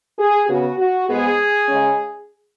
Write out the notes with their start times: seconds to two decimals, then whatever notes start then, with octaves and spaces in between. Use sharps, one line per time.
0.19 G#4
0.48 C#3 B3 F#4
0.78 F#4
1.09 G#2 G#3 B3 G#4
1.68 C#3 G#3 C#4